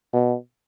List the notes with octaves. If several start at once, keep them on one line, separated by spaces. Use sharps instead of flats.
B2